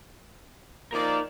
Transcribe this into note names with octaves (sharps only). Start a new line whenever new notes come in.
F3 A#3 D#4 A#4 D5